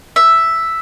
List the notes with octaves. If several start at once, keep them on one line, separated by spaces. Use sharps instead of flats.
E5